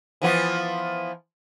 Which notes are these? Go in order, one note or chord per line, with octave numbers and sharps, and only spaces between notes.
E3 F3 B3